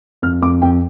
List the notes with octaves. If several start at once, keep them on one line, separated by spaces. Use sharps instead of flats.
F2 F6
F2 D6
F2 G5